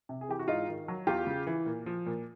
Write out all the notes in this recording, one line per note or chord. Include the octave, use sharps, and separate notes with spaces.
C3
G#4
E3 G4
F#4
G#2 D#4 F4
D#3
F#3
E2 F4 G4
C#3
E3
A#2
F3
A#2